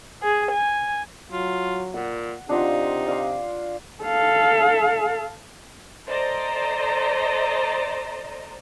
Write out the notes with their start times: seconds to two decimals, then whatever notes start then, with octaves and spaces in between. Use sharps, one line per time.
0.23 G#4
0.53 G#5
1.31 F#3 F4
1.94 A#2 F#5
2.49 C3 D4 D#4 F4 F#5
3.06 D5 F5 D6
4.04 A4 F5
6.08 A4 C5 D5 D#5 A#5